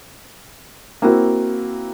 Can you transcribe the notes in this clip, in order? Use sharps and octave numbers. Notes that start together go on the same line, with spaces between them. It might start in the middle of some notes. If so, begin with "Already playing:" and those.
A#3 C4 E4 F#4 A#4